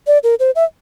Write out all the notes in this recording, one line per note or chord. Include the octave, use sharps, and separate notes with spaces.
D5
A#4
C5
E5